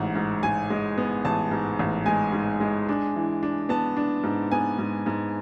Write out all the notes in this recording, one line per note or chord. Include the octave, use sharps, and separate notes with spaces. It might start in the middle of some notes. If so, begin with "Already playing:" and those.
Already playing: A1 G#2 F#5
G#2
G#2 G#5
G#3
B3
A1 A5
G#2
A1
G#3 G#5
G#2
G#3
D4
E3
D4
B3 A5
D4
G#2
B3 G#5
G#2
G#2